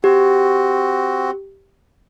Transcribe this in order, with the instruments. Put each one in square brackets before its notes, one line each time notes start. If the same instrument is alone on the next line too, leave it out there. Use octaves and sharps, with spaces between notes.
[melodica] C4 F#4 [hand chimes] G4